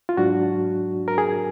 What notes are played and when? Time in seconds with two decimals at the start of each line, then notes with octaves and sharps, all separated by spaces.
0.09 F4
0.17 G#2 F#3 D4 F#4
1.08 A#4
1.18 G#4